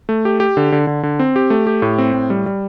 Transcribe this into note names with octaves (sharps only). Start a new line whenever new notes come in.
A3
G4
G4
D3
D3
D3
D3
C4
G4
A3
G4
A2
C4
A2
G3
G3